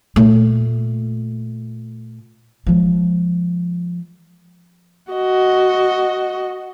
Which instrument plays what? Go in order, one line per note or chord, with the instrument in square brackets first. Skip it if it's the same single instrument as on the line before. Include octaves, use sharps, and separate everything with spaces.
[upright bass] A#2 A3
F3 G#3
[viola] F#4 D#5